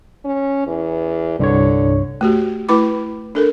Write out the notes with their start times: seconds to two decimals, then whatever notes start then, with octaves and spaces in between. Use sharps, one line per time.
0.25 C#4
0.67 E2
1.39 C2 G2 D3 C#5
2.21 A3 F#4 G4
2.69 A3 E4 B4 B5 D6
3.35 D4 A4 A#4